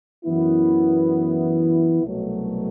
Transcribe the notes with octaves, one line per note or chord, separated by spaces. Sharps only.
F#2 E3 B3 E4
C2 B2 F#3 A3